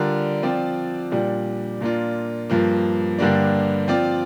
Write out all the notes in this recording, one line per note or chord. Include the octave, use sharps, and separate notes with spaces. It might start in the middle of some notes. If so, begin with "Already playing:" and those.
Already playing: D3 G3 D4 F4 A#4
F3 C4 F4 D5
A#2 G3 D4
A#2 A#3 D4 F4
G2 F3 A#3
G2 D3 G3 A#3 D4
F3 C4 F4 D5